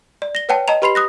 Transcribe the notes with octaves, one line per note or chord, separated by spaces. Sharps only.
D5
A#6 G7
B4 C#5 F#5 G5 A5
D#5 A5 A#5 F7
G4 B4 B5 C6 C7 F7
D#6 F#6 A#6